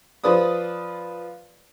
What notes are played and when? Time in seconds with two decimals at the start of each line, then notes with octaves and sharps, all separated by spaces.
0.24 F3 F4 B4 D5 D#6